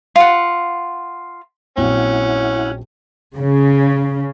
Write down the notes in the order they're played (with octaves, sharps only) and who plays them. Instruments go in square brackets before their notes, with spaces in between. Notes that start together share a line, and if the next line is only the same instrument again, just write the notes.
[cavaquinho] F4 F#5
[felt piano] A#1 F#3 C4 [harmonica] C#4 [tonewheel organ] E4 F#5
[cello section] C#3